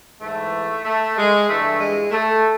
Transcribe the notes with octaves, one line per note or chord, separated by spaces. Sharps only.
G#2 E3 A3
A3
G#3
G2 E3 A3
G#3
A3